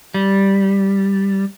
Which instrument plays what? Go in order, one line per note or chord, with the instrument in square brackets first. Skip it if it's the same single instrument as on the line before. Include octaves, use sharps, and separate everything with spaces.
[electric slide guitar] G3